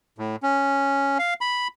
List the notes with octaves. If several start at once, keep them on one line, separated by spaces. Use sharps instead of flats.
A2
C#4
F5
B5